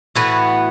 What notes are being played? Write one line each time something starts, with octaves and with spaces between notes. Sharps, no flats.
A2 E3 B3 F#4